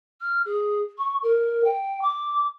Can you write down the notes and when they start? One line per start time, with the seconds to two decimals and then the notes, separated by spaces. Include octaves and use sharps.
0.21 F6
0.45 G#4
0.98 C#6
1.22 A#4
1.64 G5
2.01 D6